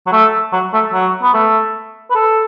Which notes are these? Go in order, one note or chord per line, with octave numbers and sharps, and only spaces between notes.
F#3
A3
F#3
A3
F#3
B3
A3
B4
A4